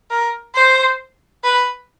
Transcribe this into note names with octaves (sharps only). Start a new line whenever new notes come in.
A#4
C5
B4